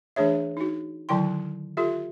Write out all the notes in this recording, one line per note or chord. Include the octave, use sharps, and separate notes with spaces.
E3 A3 D4 G#4 C#5 E5
D#4 F#4
D3 D#3 F#3 E4 G5 C6
F4 G4 A4 E5